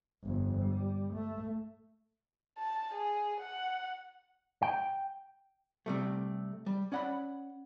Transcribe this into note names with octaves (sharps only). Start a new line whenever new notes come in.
G1 F2
G3
A3
A5
G#4
F#5
G5
C3 G3 A3
G3
C#4 D5 F#5 A#5 B5